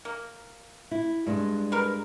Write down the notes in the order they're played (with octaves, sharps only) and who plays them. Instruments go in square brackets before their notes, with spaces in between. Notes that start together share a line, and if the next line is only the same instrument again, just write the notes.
[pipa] A#3
[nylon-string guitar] E4
G2 G#3 D4
[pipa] A#4 B4